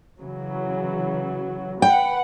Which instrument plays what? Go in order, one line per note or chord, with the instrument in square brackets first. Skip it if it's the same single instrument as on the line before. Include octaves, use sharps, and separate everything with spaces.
[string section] C#3 E3 F#3
[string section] B4 F#5 [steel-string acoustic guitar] G5